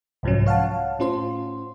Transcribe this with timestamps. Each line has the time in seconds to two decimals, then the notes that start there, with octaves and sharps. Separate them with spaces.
0.23 C2 G#2 F3 F#3 C#4
0.46 C#5 F5 F#5 A5
0.99 A2 C#4 F4 C5 C6